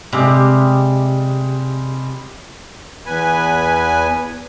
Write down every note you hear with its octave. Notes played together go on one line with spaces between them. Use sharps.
C3 G3 G#3
E2 B4 G#5